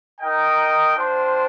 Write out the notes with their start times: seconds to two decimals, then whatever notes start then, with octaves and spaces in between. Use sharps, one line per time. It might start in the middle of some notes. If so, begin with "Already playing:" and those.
0.20 D#4 A#4 D#5 G5
0.95 D4 F4 C5 G5